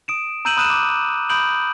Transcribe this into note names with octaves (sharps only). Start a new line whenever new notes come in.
D#6 D7 E7
A#5 E6 G6 D#7 E7 F#7
B5 D#6 F#6 D#7 E7
D6
B5 D#6 G6 D7 F#7